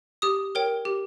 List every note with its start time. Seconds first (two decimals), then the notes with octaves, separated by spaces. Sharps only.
0.22 G4 D#6
0.55 A#4 C#5 G5
0.85 G4